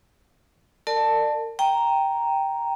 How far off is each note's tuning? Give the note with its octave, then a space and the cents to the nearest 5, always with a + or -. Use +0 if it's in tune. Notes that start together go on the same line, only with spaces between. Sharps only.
A#4 -40 D5 +30 A5 +0
G5 +0 A#5 +0